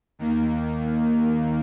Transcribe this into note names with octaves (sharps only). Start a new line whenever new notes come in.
D#2 D#3 A#3